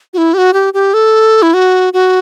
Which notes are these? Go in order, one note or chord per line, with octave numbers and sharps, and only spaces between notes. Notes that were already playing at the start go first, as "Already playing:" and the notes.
F#4
E4
G4
F#4
G4
G4
A4
E4
F#4
F#4